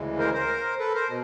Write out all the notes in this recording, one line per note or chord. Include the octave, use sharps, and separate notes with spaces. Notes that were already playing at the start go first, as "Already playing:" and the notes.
Already playing: D2 C#3 E3 G#3
A#4 C5
A#4 C5
A4 B4
A#4 C5
B2